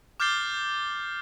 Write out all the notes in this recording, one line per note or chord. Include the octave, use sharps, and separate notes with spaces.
D6 F6 G6 A6 C7 G7